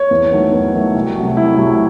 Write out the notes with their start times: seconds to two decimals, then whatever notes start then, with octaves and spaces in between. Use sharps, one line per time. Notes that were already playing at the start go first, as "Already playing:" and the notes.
Already playing: C#5
0.11 E2
0.32 D#3 F#3 A3
0.52 E2
0.74 D#3 F#3 A3
0.94 C2
1.16 C3 F#3 A3
1.36 C2 E4
1.58 C3 F#3 A3